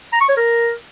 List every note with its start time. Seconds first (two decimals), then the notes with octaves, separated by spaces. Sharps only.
0.13 A#5
0.21 C#6
0.29 C#5
0.37 A#4